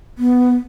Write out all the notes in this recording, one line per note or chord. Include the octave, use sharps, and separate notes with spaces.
B3